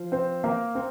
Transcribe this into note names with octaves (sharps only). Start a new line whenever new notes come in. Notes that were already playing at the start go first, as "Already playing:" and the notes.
Already playing: F3
C4 C5
A#3 A#4
C4